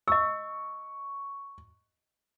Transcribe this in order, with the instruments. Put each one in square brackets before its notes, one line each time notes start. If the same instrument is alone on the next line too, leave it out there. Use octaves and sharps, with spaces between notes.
[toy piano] D#5 E6 [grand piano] C#6